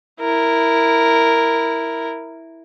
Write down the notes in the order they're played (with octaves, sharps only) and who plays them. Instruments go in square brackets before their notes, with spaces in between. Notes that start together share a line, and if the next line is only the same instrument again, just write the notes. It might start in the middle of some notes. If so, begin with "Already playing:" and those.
[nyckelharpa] E4 A#4